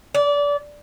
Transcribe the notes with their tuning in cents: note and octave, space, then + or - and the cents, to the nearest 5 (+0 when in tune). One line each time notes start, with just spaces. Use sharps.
D5 -25